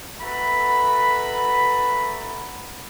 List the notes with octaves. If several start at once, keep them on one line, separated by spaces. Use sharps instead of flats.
F#4 A4 B4 E5 A#5 B5